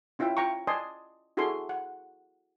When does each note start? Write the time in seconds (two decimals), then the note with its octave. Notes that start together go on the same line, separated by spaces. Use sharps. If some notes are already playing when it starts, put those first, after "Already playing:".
0.19 C#4 E4 F4 E5 G5
0.37 F4 G5 A#5 C#6
0.67 D5 D#5 G#5 A5 C6 D#6
1.37 E4 F#4 G#4 A4 D5 C6
1.69 F#5